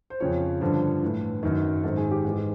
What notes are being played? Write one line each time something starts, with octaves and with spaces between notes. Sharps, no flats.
C5
F2 C#3 F3 C#5
G2 D3 F3
A2 E3
F#2 D#3
G#2 D#3 A4
G#4
G4
G#2 E3 G#4